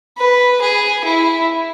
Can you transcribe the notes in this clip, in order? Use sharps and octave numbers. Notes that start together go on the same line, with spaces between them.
B4
G#4
E4